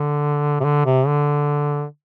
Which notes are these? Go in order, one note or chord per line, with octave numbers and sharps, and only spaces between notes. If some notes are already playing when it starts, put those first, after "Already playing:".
Already playing: D3
C3
D3
C3
D3